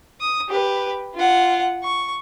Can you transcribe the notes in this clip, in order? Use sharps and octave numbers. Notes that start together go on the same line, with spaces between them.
D#6
G4 B4
F4 F#5
C#6